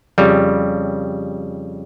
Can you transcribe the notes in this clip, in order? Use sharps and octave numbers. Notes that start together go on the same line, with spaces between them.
F2 C#3 G3